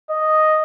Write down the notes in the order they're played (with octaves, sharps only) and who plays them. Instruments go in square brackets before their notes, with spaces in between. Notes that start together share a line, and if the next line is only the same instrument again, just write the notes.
[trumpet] D#5